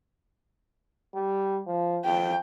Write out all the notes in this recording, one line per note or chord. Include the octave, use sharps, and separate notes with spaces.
G3
F3
F2 G5